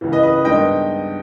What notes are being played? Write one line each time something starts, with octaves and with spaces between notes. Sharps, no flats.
C#2 C#3 E3
B4 D#5
B4 D#5
G2 D#3 G#3 B3 D#5 G5